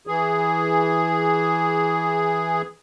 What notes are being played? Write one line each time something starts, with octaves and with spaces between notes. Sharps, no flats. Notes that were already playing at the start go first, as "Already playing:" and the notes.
E3 G#4